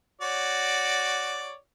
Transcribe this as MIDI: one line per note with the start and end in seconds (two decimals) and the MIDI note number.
0.21 1.55 66
0.21 1.55 73
0.21 1.55 74